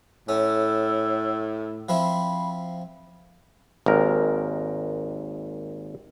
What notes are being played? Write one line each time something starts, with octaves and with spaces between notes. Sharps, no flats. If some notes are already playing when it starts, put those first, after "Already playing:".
A2 C#4 E6
F3 C4 E4 B5
G#1 D#2 A#4